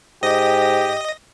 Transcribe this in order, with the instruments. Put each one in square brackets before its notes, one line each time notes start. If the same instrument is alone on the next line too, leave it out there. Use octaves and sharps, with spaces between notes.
[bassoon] G#2 [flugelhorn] G4 [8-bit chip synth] D#5 A#6